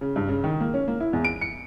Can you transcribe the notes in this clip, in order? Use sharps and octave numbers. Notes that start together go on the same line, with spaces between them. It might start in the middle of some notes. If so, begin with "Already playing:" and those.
C#3
G2
C#3
D#3
A#3
C#4
A#3
E4
E2
D7
C#7